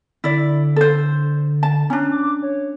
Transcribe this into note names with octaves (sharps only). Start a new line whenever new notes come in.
D3 E4 D5
A4 C5
A5
C#4 D4 A#5
D6
C#5